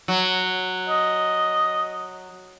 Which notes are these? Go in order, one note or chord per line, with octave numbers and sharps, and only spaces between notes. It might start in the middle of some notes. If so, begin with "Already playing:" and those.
F#3
D#5